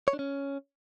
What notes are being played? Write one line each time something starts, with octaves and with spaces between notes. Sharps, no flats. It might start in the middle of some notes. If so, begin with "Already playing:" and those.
C#5
D4
C#4